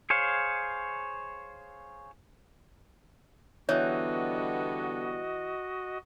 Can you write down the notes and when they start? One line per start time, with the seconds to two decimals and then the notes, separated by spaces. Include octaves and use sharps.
0.10 G#4 C5 C#5 F5
3.69 D3 E3 G3 B3 F#4 C#5 D#5